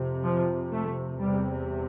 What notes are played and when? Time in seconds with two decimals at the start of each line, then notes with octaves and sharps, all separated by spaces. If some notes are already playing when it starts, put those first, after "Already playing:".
Already playing: F2 C3
0.24 F3
0.71 A3
1.19 E2 C3 G3